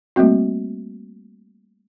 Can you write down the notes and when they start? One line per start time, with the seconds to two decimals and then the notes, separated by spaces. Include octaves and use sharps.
0.16 G3 A3 A#3 C4 F#4